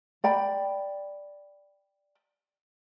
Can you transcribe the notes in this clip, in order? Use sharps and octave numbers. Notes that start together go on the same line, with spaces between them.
D5 G5 B5